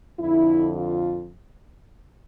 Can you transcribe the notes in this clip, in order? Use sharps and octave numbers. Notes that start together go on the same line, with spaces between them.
F2 D3 E4
F4